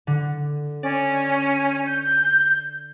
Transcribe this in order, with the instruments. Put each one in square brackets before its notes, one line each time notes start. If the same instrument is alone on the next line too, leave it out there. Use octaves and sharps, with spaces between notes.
[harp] D3
[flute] C#4 [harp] D5
[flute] G6